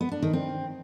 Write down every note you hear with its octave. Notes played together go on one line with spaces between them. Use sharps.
B3
D4
D#3
C4